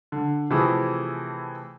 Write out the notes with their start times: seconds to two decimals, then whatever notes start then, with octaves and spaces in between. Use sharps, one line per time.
0.12 D3
0.50 C3 E3 F3 A3 E4 G#4